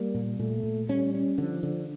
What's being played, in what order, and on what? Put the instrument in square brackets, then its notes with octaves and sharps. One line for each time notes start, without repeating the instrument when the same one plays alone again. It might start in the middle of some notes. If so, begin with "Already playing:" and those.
Already playing: [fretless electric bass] G3 [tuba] A#3
[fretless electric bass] A#2
[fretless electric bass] A#2 [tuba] A3
[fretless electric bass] A#2
[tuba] G3 [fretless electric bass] C#4
[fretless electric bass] C#4
[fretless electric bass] D3 [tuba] F3
[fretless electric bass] D3